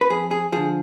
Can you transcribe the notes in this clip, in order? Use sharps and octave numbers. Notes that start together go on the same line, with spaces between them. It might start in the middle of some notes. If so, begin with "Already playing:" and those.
B4
F2 G#4
G#4
D3 F3 G#4